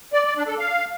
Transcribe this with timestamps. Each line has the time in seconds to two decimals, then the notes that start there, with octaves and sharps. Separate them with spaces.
0.13 D5
0.25 D5
0.36 D4
0.47 A4
0.59 F5